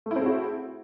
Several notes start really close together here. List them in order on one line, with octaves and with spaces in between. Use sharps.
A3 E4 C4 G#4 F#4